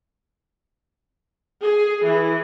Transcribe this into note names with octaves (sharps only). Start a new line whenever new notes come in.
G#4
E3